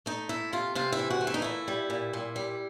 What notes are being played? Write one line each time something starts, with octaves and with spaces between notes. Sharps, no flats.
A3 D#4
A3 E4
C3 F4
C3 F4
E4
E3
F#4
A3
E4
D#4
A#2 E4
G3
A#2
A#2
G3